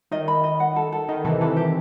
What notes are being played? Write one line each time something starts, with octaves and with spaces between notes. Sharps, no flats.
D#3 D#5
B5
D#5
F#5
A4
A4
D#3 D#5
C3 E3 A4
C3 E3 A4
G4